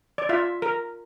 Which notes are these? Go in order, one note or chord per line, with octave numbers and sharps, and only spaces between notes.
D5
F4 E5
A#4